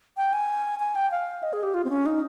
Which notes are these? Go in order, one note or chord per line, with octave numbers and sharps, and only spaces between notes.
G5
G#5
G#5
G5
F5
D#5
G#4
G4
F4
C4
C#4
D#4